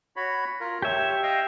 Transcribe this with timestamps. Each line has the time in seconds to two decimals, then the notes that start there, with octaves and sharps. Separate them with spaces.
0.16 F#4 C#5 B5
0.60 F4 A#4
0.82 G4 C#5 E5
1.23 D#5 F5 G5